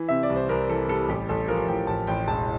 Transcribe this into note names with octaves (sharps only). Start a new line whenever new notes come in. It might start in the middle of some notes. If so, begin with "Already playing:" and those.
Already playing: E3
C3 E5
D5
C2
C5
C2 A#4
E3 A4
G3 A4
A1 G4
A1 A4
F3 A#4
A1 G5
A1 A5
A1 G5
E1 A5